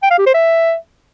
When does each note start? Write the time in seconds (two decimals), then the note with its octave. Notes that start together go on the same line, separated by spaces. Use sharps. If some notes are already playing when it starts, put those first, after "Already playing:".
0.03 G5
0.11 F5
0.18 G4
0.26 C5
0.34 E5